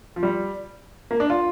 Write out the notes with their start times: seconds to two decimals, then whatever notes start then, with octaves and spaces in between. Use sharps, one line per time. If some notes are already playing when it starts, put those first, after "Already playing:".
0.16 F3
0.23 G3
1.11 A#3
1.20 D4
1.30 F4